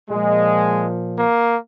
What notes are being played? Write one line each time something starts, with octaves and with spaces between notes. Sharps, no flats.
A#2 F3 G#3
A#3